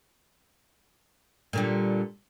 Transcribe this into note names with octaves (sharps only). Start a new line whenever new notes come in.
A#2 D3 G3